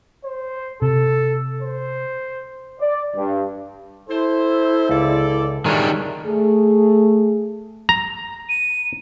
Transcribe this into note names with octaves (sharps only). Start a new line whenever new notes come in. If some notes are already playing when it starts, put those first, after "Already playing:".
C5
C3 A4
C5
D5
G2
E4 A4 C5
C#2 D3 A4 D5
D#3 G3 G#3 D4 G#4 A4 C#5 E5
A3 G#4
A#5
D#7